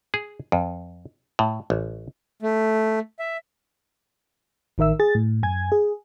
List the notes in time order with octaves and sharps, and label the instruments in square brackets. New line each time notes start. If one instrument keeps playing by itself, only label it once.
[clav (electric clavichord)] G#4
F2
A2
A1
[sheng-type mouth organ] A3
E5
[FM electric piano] A1 D#3 A#4 E5 E6
G#4 A6
A2
F#2 G#5 G#6
G#4